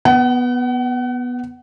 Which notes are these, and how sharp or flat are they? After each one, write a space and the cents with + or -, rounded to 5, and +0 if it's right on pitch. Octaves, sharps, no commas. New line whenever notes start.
B3 -5 F#5 +35